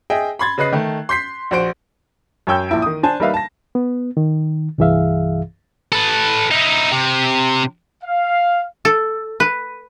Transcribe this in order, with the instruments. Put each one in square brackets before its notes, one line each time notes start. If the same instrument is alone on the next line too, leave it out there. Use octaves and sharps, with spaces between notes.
[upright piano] G#4 D#5 E5 G5
B5 C6 G#6 A6
C#3 B4 D#5 F#6 C7
D#3 A3
C6 G6 B6 C7
A#1 F#4 C5 D7
F#2 C#5 G5 E6 G6
A#1 E4 D7
D#3 D#6
D4 C5 G#5 A5
G3 A#3 D#4 B4 E5 F5
A5 A#6
[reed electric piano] B3
D#3
C2 G2 E3 G#4 E5 F5
[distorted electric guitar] A4 B4
D#4 E4
C3
[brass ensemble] F5
[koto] A4
B4